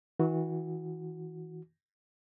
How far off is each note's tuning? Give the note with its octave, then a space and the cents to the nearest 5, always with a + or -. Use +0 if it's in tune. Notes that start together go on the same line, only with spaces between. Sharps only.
E3 -35 F#4 -15